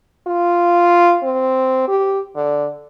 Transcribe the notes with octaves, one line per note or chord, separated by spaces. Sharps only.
F4
C4
G4
D3